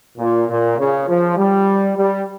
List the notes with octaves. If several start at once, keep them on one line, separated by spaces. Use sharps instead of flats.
A#2
A#2
C#3
F3
G3
G3